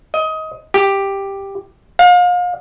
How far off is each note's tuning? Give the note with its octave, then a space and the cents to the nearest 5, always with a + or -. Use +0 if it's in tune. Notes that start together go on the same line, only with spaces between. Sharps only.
D#5 +20
G4 +5
F5 +35